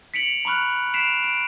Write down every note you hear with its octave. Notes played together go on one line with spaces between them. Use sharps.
B6 C#7 D7 F7 F#7
A#5 B5 C#6 F6 F#6
B6 C7 D7 E7 F7
D7